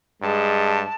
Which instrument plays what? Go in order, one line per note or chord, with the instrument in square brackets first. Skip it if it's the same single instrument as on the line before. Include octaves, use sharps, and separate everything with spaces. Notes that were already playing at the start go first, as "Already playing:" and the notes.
[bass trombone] G2 [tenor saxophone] G#3 [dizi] A5